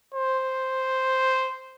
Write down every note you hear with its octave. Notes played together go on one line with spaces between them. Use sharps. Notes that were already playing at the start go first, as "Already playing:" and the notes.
C5